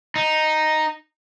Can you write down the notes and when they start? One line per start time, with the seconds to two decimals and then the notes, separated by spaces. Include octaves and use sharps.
0.16 D#4